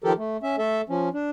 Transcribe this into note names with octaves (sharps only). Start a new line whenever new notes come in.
D#3 F3 G4 A4 A#4
A3
C#4 E5
A3 A4 E5
F3 C#4
D4